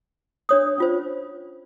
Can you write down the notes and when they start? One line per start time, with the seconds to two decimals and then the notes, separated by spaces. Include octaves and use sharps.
0.49 D4 C#5 D#6
0.78 C#4 F4 C5